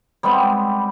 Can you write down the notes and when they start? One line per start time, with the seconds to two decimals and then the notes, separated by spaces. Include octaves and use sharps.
0.23 G3 G#3 B3 C4